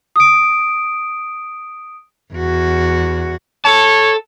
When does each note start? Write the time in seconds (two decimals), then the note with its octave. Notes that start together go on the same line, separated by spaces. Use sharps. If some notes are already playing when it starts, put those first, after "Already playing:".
0.16 D#6 D7
2.33 E2 F#4
3.65 A4 C#5 A5